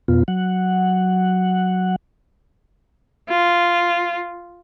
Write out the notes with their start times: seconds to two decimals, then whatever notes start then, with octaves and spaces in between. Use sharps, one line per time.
0.08 F2 B2 B3 F4
0.28 F#3 F#5
3.29 F4